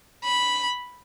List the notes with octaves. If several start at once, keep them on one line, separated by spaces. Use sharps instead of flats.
B5